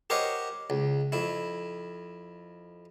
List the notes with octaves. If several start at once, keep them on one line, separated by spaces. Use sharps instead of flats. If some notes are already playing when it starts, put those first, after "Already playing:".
G4 A#4 C5 C#5 D#5 F#5
C#2
F2 E4